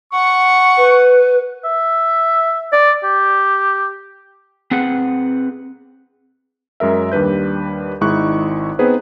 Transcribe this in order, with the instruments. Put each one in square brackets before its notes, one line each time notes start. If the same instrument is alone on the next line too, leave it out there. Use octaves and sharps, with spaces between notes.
[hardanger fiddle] F#5 [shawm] C#6
[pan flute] B4
[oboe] E5
D5
G4
[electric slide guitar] C4 G#4 B4 F#5
[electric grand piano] F#2 G#3 A#4 E5
D#2 G3 D4 B4 G6
G#1 G#3 D#4 E4 C#6 F#6
B3 C4 D#4 G#4 B4 C5